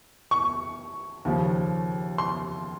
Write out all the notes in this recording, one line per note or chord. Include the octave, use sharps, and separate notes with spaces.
C#6
D#2 C#3 F3 A#3
C6